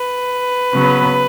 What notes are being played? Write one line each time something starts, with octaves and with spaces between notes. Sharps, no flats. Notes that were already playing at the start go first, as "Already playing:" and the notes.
Already playing: B4
C#3 F#3 B3